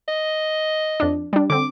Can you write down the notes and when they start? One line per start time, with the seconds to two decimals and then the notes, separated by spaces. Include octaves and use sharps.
0.08 D#5
1.00 F2 D4
1.33 G3 D4
1.50 D3 C4 D6